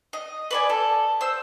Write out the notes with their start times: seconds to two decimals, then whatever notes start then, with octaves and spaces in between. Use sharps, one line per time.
0.13 D#5
0.51 B4 D5 G#5
0.69 A4
1.21 C5 E6